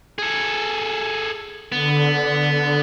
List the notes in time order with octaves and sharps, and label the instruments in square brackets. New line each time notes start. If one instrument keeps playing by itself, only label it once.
[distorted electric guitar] G#4 A4
[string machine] D3 [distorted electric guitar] B3